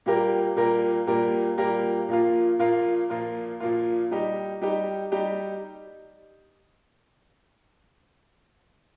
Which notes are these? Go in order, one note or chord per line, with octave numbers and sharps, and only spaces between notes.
A#2 G3 A#3 G4 A#4
A#2 G3 A#3 G4 A#4
A#2 G3 A#3 G4 A#4
A#2 G3 A#3 G4 A#4
A#2 F3 A#3 F4
A#2 F3 A#3 F4
A#2 F3 A#3 F4
A#2 F3 A#3 F4
G3 D#4 G4
G3 D#4 G4
G3 D#4 G4